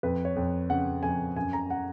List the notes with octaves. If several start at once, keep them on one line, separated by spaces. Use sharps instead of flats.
F2 B4
C#5
F2
C#3 F#5
F2 G#5
F#2 G#5
A#5
F#5